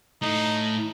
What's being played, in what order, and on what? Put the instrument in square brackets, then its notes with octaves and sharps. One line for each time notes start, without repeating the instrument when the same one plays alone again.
[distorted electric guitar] A2 [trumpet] D#4